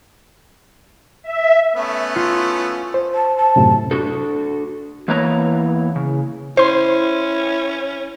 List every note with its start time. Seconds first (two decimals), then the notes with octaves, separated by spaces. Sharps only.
1.22 E5
1.75 A3 B3 C#4
2.16 F4
2.94 C5
3.14 A5
3.37 A5
3.56 F#2 A2 C3
3.91 D4 F#4 A4
5.08 E2 E3 A#3 B4 C#5 A#5
5.96 C#3
6.57 C#4 E4 C5 C6